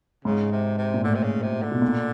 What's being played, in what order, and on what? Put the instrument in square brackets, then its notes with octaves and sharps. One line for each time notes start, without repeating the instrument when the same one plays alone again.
[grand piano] G#2 [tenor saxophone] C#3
[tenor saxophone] C3
C3
[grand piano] A#2
[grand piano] A2 [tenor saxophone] D3
[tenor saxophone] C3
C#3
C3
D3
[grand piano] B2
A#2